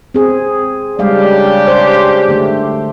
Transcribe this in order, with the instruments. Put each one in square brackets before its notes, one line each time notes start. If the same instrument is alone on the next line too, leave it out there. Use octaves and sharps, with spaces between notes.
[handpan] C4 G#4
[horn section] C#3 D4 G4 [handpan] G3 G#3 F5
[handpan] C5
D3 A3